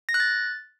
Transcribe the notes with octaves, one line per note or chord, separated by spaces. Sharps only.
A#6
F#6
A6